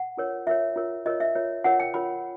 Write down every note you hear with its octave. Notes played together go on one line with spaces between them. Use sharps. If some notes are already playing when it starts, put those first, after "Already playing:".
Already playing: F#5
F4 A#4 C#5
F4 A#4 C#5 E5
F4 A#4 C#5
F4 A#4 C#5 D#5
E5
F4 A#4 C#5
F4 A#4 C#5 F#5
G5
F4 A#4 C#5 B5